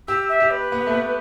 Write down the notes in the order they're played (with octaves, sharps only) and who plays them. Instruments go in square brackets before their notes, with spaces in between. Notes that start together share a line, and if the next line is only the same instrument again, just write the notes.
[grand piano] G4 [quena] E6
[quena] E5
[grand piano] G4
[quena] B4
[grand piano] B3
A3
B3